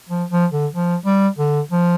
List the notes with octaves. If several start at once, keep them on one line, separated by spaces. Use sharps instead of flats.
F3
F3
D3
F3
G3
D3
F3